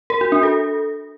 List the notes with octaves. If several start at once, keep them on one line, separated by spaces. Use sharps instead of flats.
A#4
F#4
D4
A4